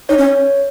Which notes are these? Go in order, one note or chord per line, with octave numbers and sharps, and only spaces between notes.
D#4 C#5
C#4